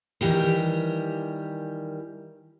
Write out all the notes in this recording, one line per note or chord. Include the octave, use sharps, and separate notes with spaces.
D#3 E3 G3 G4 A#4